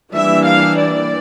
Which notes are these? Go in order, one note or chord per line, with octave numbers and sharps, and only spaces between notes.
E3 G3 A#3 D4 E5
F5
D5